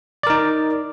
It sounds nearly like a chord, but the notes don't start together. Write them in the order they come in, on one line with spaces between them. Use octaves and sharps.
D5 A#4 D#4